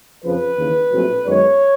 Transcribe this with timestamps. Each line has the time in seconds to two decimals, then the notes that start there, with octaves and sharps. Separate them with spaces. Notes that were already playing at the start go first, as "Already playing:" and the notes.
0.23 F2 C#3 F3 B4
0.57 D#2 C#3 E3
0.92 A#1 A2 F#3 A3 C4
1.26 F#2 D#3 G#3 B3 C#5